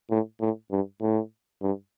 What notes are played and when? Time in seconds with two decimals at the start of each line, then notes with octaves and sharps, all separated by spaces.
0.10 A2
0.41 A2
0.71 G2
1.01 A2
1.62 G2